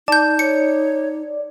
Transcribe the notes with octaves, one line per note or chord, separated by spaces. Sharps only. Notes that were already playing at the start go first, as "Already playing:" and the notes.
D#4 D5 A5 G6
C#5 C#7